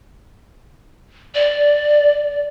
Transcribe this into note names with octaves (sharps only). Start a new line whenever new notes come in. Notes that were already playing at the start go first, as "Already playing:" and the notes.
D5